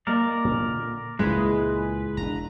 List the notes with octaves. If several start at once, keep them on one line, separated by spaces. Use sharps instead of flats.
A#3 A#4 D5 D#5
A#2 D3
C#2 A#2 G#3 A#3 E4 B4
E1 D4 A#5